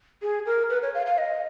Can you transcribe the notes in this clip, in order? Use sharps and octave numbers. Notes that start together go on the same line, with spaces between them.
G#4
A#4
B4
C#5
F5
F5
D#5